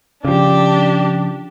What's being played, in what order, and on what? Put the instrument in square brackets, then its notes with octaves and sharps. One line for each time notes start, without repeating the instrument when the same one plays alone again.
[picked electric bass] C#3 F3 [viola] D4 G4